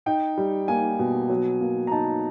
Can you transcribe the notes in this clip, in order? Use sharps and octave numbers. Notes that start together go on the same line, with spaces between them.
D#4 G5
G3
A#3 G#5
B2
F#3
A#3
A#5
D#4 A5